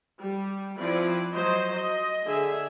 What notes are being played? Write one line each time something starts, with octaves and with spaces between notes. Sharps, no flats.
G3
F3 C4 E4 B4 D5
F#3 C5 D#5
D#5
D3 G#4 E5